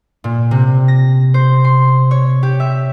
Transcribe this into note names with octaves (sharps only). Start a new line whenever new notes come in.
A#2
C3
A#6
C5
C6
C#5
G4
E5